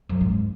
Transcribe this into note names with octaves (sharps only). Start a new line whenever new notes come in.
F#2
G#2